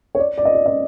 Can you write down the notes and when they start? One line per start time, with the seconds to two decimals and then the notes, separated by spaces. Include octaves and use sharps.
0.15 C#5
0.19 D5
0.37 D5
0.45 D#5
0.55 D5
0.66 D#5